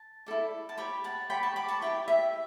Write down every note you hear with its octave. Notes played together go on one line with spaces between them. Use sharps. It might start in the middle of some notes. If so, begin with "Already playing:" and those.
Already playing: A5
E4 A4 D5
A5
G4 C#5 G5 B5
F#5 A5
G4 C#5 G5 B5
A5 C#6
B5 D6
A5 C#6
E4 G4 C#5 G5 B5
E5